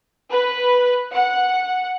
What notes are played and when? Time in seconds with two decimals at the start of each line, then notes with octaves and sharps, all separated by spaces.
0.30 B4
1.12 F#5